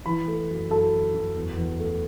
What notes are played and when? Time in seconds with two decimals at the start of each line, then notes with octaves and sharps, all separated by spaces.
0.06 E3 B5
0.27 A3
0.49 F#2
0.70 F#2 A4
0.92 F#2
1.14 F#2
1.35 E2
1.57 E2
1.79 A3